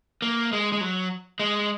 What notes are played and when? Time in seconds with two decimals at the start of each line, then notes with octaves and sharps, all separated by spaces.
0.22 A#3
0.53 G#3
0.72 G#3
0.81 F#3
1.40 G#3